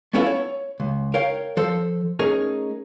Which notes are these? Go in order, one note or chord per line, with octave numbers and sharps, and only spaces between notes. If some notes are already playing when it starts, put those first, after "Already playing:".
A3 B3 C#4 E4 F4 A4
C#5
C#2
A#4 C#5 F5 G5
F3 A4 C5
A3 C#4 D#4 G#4 A#4